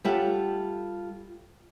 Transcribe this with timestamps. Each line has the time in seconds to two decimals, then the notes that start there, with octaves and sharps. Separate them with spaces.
0.04 G3 F4 G4 A4 E5 F#5